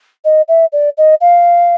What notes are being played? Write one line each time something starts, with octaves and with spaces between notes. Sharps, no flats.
D#5
E5
D5
D#5
F5